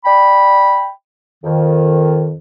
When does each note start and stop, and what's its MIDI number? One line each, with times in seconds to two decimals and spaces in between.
0.05 0.89 74
0.05 0.89 79
0.05 0.89 83
1.43 2.35 41
1.43 2.35 51